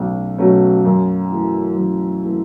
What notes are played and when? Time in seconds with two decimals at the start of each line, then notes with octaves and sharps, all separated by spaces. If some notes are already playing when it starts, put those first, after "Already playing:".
Already playing: B1 B2 F#3 A3 C#4
0.38 B2 F#3 A3 C#4
0.85 F#2
1.30 E3 A3
1.77 F#2
2.23 E3 A3